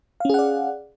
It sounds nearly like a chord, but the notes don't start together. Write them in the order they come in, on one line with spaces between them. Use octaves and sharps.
F5 C#4 G#4 F#5 D5